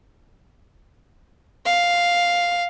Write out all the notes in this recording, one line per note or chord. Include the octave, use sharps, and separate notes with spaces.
F5